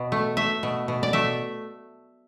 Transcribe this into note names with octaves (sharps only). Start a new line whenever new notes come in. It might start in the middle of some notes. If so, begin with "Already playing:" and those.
Already playing: B2
A3
A3 E5
B2
B2
D5
A3 E5